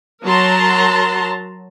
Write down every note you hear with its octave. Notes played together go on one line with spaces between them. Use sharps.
F#3 A#4 A5 A#5 C6